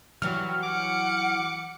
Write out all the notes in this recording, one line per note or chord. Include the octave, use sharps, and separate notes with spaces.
E3 F#3 F#4 G4 F6
F#5 D6 C#7